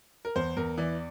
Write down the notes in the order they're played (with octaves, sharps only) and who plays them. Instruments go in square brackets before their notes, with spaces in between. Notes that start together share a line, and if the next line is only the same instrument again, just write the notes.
[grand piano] A#4
E2 C5
E2 A#4
E3 D5